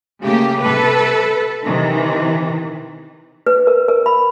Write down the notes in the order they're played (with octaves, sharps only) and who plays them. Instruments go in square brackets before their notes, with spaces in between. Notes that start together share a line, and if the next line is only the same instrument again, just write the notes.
[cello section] C#3 A3 A#3 G4
C3 A4 B4
C3 D#3 E3
[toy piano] B4
A#4
A#4
B5